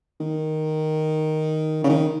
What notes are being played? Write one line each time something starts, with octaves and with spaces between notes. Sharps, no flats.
D#3
C#3
D#3